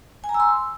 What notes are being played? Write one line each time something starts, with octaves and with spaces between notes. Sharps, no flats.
G#5
A#5
E6
C6